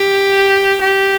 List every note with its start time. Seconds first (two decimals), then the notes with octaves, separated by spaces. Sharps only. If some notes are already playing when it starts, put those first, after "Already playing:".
Already playing: G4
0.81 G4